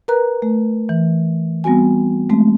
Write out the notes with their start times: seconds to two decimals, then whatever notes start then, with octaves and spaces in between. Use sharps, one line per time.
0.08 A#4 B4 A#5 F#6
0.42 A3
0.89 E3
1.64 G3 B3 C4 F#4 G#5
2.30 G#3 A3 C4